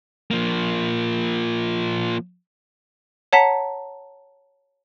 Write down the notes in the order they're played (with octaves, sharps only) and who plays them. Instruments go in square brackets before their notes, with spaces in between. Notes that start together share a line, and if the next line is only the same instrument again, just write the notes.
[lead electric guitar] F3 A#3
[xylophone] C#5 F#5 A5 A#5 B6